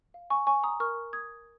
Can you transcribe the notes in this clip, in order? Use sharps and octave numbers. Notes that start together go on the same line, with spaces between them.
F5
G#5 C#6
C#5 G#5 C#6
A#5 D#6
A#4 C#6 F6
A#4 D#6 G#6